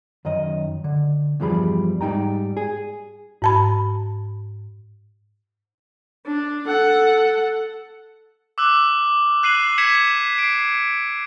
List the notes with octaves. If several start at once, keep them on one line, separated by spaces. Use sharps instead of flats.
F#2 D#3 D#5
D3
E2 G2 F3 G3 G#4 B5
G#2 G3 D#4 G5 A#5
G#4
G#2 A5 B5
D4
A4 F#5
D6 E6 F#6
F#6 C7 D#7 F#7
G#6 B6 C#7 E7 F#7
C7 D7